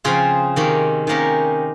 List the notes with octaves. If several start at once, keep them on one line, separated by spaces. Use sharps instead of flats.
C#3 F3 C4 F4 G#4
C3 D#3 A#3 C#4
C3 D#3 A#3 C#4 G4 A#4